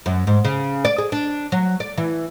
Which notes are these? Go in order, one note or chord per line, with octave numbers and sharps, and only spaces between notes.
F#2
G#2
C#3
D5
G#4
D4
F#3
D5
E3